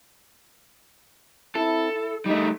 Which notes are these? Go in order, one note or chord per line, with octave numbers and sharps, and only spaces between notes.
C4 E4 A4
E4
G3 A3 D#4